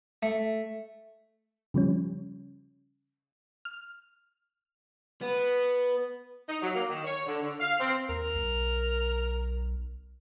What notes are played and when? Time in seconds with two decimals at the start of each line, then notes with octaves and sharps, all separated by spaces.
0.23 A3
1.74 C#3 F3 G3 C#4
3.65 F6
5.22 B3
6.48 D#4
6.62 F#3
6.74 A#3
6.89 D#3
7.04 C#5
7.26 D3
7.41 D3
7.60 F5
7.80 C4
8.09 D#2 A#4
8.35 B1